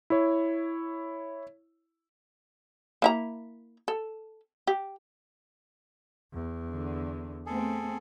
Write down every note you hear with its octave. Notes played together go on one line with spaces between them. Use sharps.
E4 C#5
A#3 E4 A#5
A4
G4
E2
D3
A3 B3 C4 G#4 A4